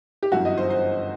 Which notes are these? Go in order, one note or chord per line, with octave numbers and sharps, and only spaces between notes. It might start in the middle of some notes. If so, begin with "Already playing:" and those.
G4
G1 F#2 E3 F#4
D#5
C5
C5